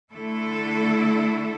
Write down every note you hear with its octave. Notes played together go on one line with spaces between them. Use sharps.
D3 A3 E4 A4